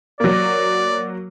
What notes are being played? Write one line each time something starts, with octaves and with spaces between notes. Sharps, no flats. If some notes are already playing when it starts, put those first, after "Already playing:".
F#3 A#3 D5